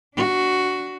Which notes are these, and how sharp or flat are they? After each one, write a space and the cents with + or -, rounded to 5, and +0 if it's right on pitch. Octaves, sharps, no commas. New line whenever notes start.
D4 -10 F#4 +5